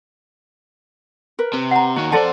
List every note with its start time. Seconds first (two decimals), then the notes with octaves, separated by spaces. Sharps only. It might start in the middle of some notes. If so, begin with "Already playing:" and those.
1.39 A#4 B4
1.53 C3 B4
1.71 F#5 A#5
1.96 D#2 D#3 F#4
2.12 F2 A4 C5 D5 F#5 A5 C6